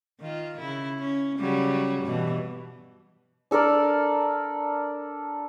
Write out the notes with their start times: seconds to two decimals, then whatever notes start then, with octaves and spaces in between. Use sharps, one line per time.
0.20 D#3 F4
0.60 C#3 E4
1.00 C#4
1.39 C#3 F#3 G3
2.04 G2 B2 E3
3.51 D4 A4 A#4 D5